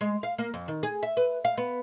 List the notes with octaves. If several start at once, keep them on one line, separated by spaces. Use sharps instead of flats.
G#3
F5
A#3
F2
D#3
G#4
E5
B4
F5
B3